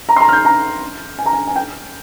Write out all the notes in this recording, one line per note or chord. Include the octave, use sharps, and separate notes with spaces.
A#5
C6
A#5
F6
G6
A#5
G#5
A#5
G#5
G#5
G5